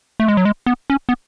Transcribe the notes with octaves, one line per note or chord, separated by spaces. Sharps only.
A3
G#3
F#3
G#3
B3
C#4
B3